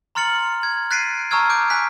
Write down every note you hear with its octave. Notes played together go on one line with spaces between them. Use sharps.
A#5 C6 F6 A6 C#7 F#7
G#6
F#6 A6 B6 C7 D7 D#7
A5 A#5 C#6 E6 F6 G#6
D6 G6 D7
G#5 F#6 B6